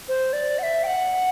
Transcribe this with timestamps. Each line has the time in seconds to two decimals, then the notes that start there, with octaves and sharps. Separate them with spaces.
0.09 C5
0.33 D5
0.59 F#5
0.63 E5
0.83 G5
0.87 F#5